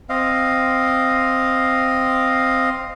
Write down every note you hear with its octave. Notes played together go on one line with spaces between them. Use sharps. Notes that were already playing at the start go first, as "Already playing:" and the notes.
C4 D#5 F5